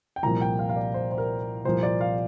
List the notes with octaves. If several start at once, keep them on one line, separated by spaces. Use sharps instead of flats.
G5
C2 A#2 F3 A#3 A#5
G5
F5
F5
D5
C5
C5
A#4
C2 A#2 F3 A#3 C5
D5
F5